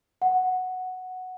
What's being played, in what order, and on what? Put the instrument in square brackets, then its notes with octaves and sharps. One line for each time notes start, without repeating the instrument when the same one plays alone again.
[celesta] F#5